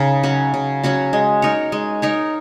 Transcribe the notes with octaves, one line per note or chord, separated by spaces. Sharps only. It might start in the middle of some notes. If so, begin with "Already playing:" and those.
Already playing: C#3 D#4 A#4
F#3 C#4 F#4
C#3
F#3 C#4 F#4
G#3
D#4 A#4 C#5
G#3
D#4 A#4 C#5